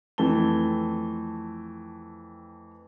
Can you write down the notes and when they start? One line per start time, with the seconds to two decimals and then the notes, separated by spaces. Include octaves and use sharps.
0.18 F2 E3 A3 C4 A5 G7